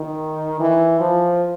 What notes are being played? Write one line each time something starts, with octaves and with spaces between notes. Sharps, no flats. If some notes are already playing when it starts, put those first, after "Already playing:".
Already playing: D#3
E3
F3